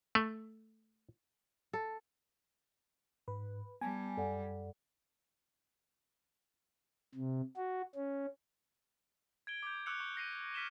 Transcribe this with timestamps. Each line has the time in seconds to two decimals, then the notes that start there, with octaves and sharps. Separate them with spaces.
0.15 A3
1.73 A4
3.28 G#2 B4
3.81 G3 B3 G#5 A5
4.17 F#2 A4 D5 F#5
7.14 C3
7.57 F#4
7.95 C#4
9.47 G#6 D7 G7
9.63 D6 G6
9.86 C#6 D6 E6 F#6 C#7 F7
10.00 C#6
10.16 F#6 A#6 C7 D#7
10.54 F6 B6 D#7 E7 G7